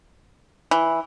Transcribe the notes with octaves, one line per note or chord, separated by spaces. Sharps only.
E3